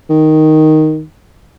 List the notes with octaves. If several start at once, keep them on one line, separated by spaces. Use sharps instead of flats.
D#3